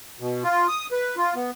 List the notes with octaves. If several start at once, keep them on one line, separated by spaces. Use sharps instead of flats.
B2
F4
D#6
B4
F4
B3